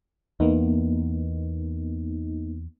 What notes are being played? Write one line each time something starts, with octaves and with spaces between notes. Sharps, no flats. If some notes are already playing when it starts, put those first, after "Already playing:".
E2 A#3 B3 D#4